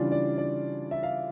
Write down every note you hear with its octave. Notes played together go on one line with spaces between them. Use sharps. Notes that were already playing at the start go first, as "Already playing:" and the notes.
Already playing: C#3 E3 G3 D4 F4 D5
D5
D5
E5
F5